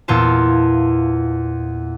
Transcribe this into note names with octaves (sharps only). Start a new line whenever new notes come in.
E2 A#2 F4 A5